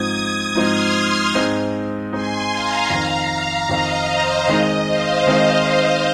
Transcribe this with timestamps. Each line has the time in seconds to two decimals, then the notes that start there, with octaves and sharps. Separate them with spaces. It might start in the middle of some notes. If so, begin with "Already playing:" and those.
Already playing: G#2 F3 C4 D#4 D#6 G#6
0.55 G#2 F3 C4 D#4 C6 F6
1.34 G#2 G#3 C4 D#4
2.12 G#2 G#3 C4 D#4 G#5 C6
2.51 F5 A#5
2.90 F2 D#3 C4 F5 A#5
3.69 F2 D#3 C4 D#5
4.08 C5
4.47 D#3 G#3 C4 D#4 D#5
4.87 C5 F5
5.27 D#3 G#3 C4 D#4